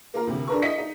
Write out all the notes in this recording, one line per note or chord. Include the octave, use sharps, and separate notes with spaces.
A#3 F4 A#4
D2 C3
D4 G#4 A#4 B4 C#6
E4 D#5 B6 C#7
D#4